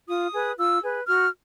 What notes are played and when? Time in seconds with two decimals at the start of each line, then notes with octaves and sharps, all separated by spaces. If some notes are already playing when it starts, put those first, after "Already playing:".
0.08 F4 D#6
0.33 G#4 B4
0.58 F4 E6
0.82 G#4 B4
1.06 F#4 F6